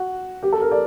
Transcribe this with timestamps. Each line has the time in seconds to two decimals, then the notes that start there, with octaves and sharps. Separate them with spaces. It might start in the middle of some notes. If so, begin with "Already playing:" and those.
Already playing: F#4
0.43 G4
0.53 A4
0.61 A#4
0.71 D5